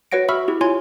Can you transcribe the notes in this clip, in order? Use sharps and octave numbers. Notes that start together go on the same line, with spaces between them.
F#4 B4 C#5 F#5 A#6 D7
F#4 E5 B5 C#6 E6 F6
E4 G4
E4 F4 C#5 G#5 C6 G#6